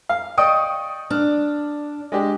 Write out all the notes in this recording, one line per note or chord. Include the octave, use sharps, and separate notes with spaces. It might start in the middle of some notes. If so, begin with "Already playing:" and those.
F5
D5 D#5 G5 C#6 D#6
D4 F6
G#3 D4 G4